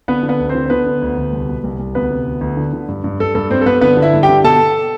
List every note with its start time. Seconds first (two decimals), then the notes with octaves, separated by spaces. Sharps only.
0.08 D3 B3 B4
0.23 D3
0.29 B3 B4
0.39 D2
0.49 C4 C5
0.55 D3
0.66 C5
0.70 D3 B3 B4
0.86 D3
1.02 D2
1.17 D2
1.33 C2
1.49 B2
1.64 C2
1.79 C2
1.95 D2 B3 B4
2.11 C3
2.27 D2
2.41 D2
2.57 D3
2.73 D3
2.88 G2
3.04 G2
3.20 G2 A4
3.35 G2 A4
3.51 G2 C4 C5
3.61 A4
3.66 G2 B3 B4
3.81 D3 B3 B4
3.97 D3
4.02 E4 E5
4.14 G2
4.23 G4 G5
4.29 D3
4.44 B2 A4 A5